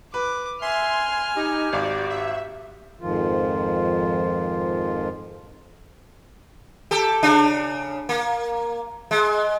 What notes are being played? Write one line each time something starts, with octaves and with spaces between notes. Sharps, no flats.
B4 D6
E5 G#5 C6 F6
D#4 G4
G#1 F#4 D5
E5
F2 G#2 D#3 F3 F4
G4 A4
C#3 D4
A#3
G#3